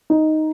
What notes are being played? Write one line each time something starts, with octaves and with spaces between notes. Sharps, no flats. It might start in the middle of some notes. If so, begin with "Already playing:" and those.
D#4